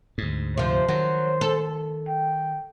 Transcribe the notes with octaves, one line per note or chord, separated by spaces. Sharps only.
D2 G#2
C3 F3 C5
D#3 F#3
A4
G5